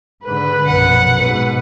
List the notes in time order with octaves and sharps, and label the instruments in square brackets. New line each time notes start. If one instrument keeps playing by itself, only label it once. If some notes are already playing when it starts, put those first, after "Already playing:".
[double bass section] G#2 D3 [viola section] B4
[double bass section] A#1 F#2 B2 [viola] F#5
[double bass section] G#2 B2 [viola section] B4